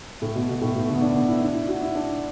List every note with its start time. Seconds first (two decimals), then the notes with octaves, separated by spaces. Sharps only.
0.22 A2
0.35 B2
0.49 B2
0.61 A2
0.75 B2
0.89 D3
0.95 B3
1.01 D4
1.15 B3
1.29 E4
1.42 D4
1.55 E4
1.68 F#4
1.82 E4
1.95 D4